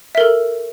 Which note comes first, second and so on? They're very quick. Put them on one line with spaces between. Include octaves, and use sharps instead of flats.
E5 A#4 A4